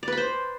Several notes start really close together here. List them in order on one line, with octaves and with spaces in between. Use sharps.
D5 B4 B5 C5